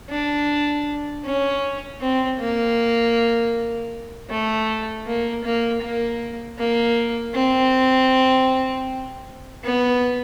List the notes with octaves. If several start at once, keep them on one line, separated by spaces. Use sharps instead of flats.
D4
C#4
C4
A#3
A3
A#3
A#3
A#3
A#3
C4
B3